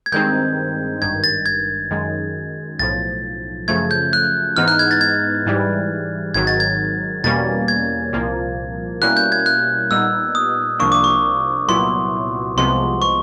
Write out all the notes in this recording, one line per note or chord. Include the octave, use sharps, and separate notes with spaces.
G#6
G2 D#3 G#3 C4 D#4 G6
G#1 G2 D#3 G#6
A6
G#6
F#2 D#3 G#3
B1 A2 F3 A6
F#2 C#3 F3 A3 G#6
G6
F#6
G#2 E3 G#3 B3 D#4 F6
F#6
G#6
A6
G#6
G#2 E3 G3
G#1 G#2 D#3 F#3 G#6
A6
G#6
E2 B2 G3 A#3 C#4 A6
G#6
C2 A#2 F3 A#3
B2 G3 A#3 C#4 E4 F#6
G6
G#6
F#6
A#2 G3 B3 D#4 E6
D#6
C2 C3 F3 A#3 D4 C#6
D6
C#6
C2 A#2 F#3 B3 E4 C6
C2 C3 F3 G#3 B3 C6
C#6